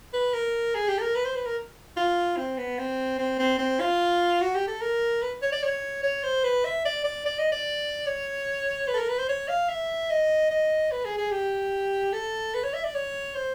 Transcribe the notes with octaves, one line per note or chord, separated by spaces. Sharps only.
B4
A#4
G#4
G4
A4
A#4
B4
C5
B4
A#4
F4
C4
B3
C4
C4
C4
C4
F4
F#4
G4
A4
A#4
B4
C#5
D5
C#5
C#5
C5
B4
E5
D5
D5
D5
D#5
D5
C#5
B4
A4
A#4
B4
C5
C#5
F5
E5
D#5
D#5
B4
G#4
G#4
G4
A4
B4
C#5
E5
D5
C#5
C5